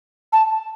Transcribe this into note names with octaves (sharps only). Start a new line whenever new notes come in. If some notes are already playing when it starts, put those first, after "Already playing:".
A5